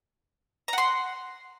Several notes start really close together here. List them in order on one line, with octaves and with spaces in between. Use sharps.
A#5 F#5 C6